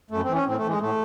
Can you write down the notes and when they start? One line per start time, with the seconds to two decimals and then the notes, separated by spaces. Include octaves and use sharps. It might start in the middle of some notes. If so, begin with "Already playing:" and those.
0.10 F#2 A3
0.22 C4
0.28 E3
0.34 C#4
0.46 A2 C4
0.57 A3
0.64 E3 G#3
0.80 A2 A3